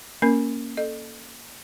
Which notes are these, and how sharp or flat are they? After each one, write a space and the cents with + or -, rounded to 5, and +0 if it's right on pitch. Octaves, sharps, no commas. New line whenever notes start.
A#3 +0 C#4 +0 A#4 +0
A4 +0 D#5 -35